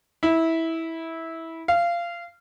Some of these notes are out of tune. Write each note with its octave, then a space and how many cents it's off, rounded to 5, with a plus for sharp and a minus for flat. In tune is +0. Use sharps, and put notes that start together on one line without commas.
E4 -15
F5 -20